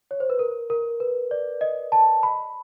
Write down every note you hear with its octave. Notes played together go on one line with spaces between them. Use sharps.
C#5
C5
B4
A#4
A#4
B4
D5
D#5
A5
B5